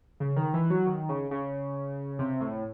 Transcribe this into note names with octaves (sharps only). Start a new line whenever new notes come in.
C#3
D#3
E3
F#3
D#3
C#3
C#3
C3
A2